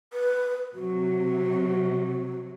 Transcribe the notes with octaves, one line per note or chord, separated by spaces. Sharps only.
B4
C3 F#3 F#4